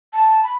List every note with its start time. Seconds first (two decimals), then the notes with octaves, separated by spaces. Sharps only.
0.13 A5
0.43 B5